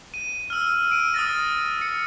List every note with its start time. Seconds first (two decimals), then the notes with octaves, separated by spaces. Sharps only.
0.14 D#7
0.50 E6 F6
0.90 E6 D7 D#7
1.14 D#6 F6 A6 A#6
1.81 C#7